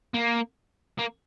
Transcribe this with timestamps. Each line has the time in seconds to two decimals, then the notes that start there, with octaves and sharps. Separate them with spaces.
0.14 A#3
0.99 A#3